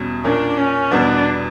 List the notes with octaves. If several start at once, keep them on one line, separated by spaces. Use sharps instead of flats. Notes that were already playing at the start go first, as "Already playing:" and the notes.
Already playing: E2 B2 G3 C#4
A#2 A#3 C#4 D4
C#4
E2 B2 G3 B3 D4